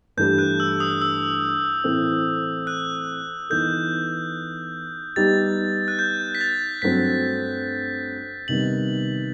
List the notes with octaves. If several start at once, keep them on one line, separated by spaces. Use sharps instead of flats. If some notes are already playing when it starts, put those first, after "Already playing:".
G2 E3 A3 E4 G4 G6
F#6
E6
D#6
E6
A2 E3 A3 C4
F#6
E3 B3 D#4 A4 G6
G3 B3 D#4 G4 A6
F#6
G6
B6
A6
G2 F#3 A3 C4 B6
C3 D#3 G3 B3 F#7